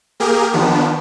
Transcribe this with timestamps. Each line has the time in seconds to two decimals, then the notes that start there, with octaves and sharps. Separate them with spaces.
0.20 A#3 G4 G#4 A#4
0.53 D#3 F3 B3 D4